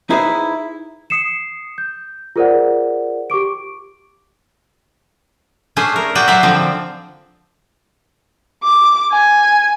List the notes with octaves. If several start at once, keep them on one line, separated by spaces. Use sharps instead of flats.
D#4 E4 G#4 B4 C5
D#6 C7 C#7 E7
G6
F4 G#4 A#4 C5 D5 F#5
G4 C#6 D6 D7
A3 C#4 D4 G#4 C5 E5
A#4
F#4 G#4 D5 E5 F#5 G5
F#3 G3 G#4 C5 D5 E5
D3 F3 C4
D6
G#5